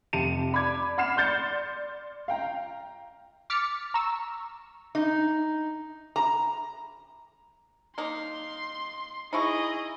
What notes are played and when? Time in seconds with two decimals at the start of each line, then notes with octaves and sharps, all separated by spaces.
0.13 F1 G4 A5 C#7 D#7
0.53 D5 B5 D6 G#6
0.98 F#5 B5 F6 C7 E7
1.16 D5 C6 G6 A6 C#7
2.28 F5 G5 A#5
3.50 D6 F6 A6 B6 C#7
3.94 A#5 C#6 E6
4.95 D#4
6.16 A#5
7.98 A#3 D#4 C6
9.33 D#4 E4 G#4 D#5 C#6